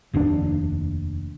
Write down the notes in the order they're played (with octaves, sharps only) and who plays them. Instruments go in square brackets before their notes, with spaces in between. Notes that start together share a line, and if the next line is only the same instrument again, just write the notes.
[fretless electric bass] F1 D#2 B2 D4